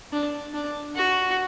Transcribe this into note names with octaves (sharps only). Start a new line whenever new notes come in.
D4
D4
F#4